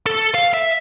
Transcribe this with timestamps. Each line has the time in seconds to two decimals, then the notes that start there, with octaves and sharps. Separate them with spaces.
0.06 A4
0.34 F5
0.53 E5